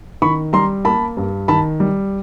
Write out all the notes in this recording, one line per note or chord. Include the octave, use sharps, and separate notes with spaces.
D#3 B5 C#6
G3 A#5 C6
A#3 A5 B5
G2
D#3 A5 B5
G3